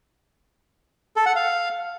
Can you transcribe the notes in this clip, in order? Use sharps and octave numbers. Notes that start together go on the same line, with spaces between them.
A4
F#5
F5